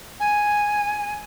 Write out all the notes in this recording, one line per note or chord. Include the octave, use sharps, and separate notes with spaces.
G#5